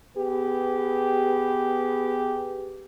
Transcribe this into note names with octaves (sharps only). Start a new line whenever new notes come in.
B3 G4 G#4 B4